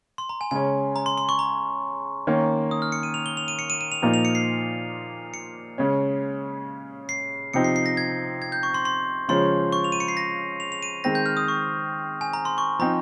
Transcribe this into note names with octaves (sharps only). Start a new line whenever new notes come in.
C6
A#5
G#5
C#3 G#3 C#4 G#5
A#5
C6
C6
C#6
A#5
D#3 A#3 C#4
D#6
F6
C#7
D#7
F7
G7
F7
D#7
C#7
D#7
D#7
F7
A#2 F3 A#3 D#4
F7
C#7
C7
C#7
C#3 G#3 C#4
C7
C3 F3 C4 D#4 C#7
C7
C7
A#6
G#6
G#6
G6
C#6
C6
C6
C#3 F3 G#3 C#4 C6
C#6
F7
D#7
C#7
C7
A#6
F7
F7
D#7
D#3 G#3 C4 A#6
G6
F6
D#6
C#6
G#5
A#5
C6
C#6
F3 C4 D#4 A#5